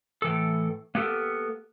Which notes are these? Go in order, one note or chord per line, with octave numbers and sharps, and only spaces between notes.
A2 E3 A4
A#3 B3 G4 A4 A#4